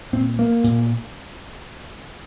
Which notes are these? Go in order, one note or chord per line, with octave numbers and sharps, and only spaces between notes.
A#2 C4
A#3
A#2